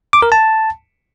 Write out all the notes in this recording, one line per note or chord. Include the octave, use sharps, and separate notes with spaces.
D6
A#4
A5